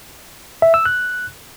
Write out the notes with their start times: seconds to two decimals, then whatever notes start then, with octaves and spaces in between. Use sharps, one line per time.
0.62 E5
0.74 E6
0.86 F#6